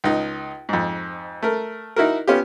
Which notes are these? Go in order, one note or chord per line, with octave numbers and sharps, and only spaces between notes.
C#2 D#4
F2 G#2
A3 A#4
D#4 E4 F#4 A#4
B3 C#4 F4 G4